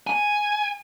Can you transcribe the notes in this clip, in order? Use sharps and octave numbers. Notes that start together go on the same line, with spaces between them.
G#5